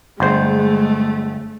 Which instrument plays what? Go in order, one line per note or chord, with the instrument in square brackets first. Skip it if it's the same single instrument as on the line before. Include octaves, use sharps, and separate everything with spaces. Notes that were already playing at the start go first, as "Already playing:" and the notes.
[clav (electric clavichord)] G1 C5 [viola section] G#3 [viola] A3